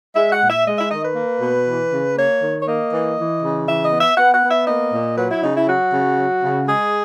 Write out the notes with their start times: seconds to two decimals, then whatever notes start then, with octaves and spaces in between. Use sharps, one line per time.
0.15 G#3 E5
0.32 F#5
0.41 A#2
0.49 E5
0.66 G#3 D#5
0.78 E5
0.91 D#3 D#5
1.04 B4
1.16 A#3
1.41 B2
1.66 E3
1.92 C#3
2.17 A#3 C#5
2.42 D#3
2.62 C#5
2.66 A#3 D#5
2.92 E3
3.17 E3
3.43 C#3
3.67 E3 E5
3.84 D#5
3.92 B3
4.01 E5
4.17 B3 F#5
4.34 F#5
4.43 B3
4.50 E5
4.67 A#3 D#5
4.93 A#2
5.17 F#3 B4
5.31 E4
5.43 C#3 D#4
5.56 E4
5.68 F#3 F#4
5.93 C#3
6.19 F#3
6.43 C#3
6.68 G#3 G#4